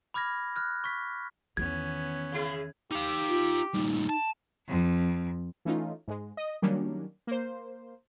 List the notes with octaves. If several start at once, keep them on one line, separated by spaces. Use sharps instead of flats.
B5 D6 F6 G#6 A#6
F6 F#6
C#6 B6
E2 D#3 B3 C#4 G#6
C#3 E4 G#4
D#4 G4 F5
F4
G2 A#2 D#4
A5
F2
E3 A3 C#4 D#4 F4
G#2 G#3
D#5
D#3 F#3 G3 A#3 C#4 D4
A#3 C5